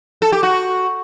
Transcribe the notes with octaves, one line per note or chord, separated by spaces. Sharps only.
A4
G4
F#4